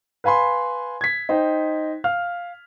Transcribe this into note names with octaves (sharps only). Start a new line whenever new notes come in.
B4 F5 G#5 B5 C6
G#6 B6
D#4 C5 G5
F5 F6